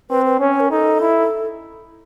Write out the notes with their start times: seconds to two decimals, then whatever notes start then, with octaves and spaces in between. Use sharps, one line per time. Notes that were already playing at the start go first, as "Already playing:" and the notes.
0.10 C4 B4
0.25 B4
0.40 C#4 C#5
0.50 C#5
0.60 A#4
0.70 D#4 A4
1.00 E4